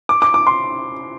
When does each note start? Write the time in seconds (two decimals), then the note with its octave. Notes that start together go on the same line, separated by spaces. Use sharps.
0.09 D6
0.22 D6
0.34 D6
0.47 C6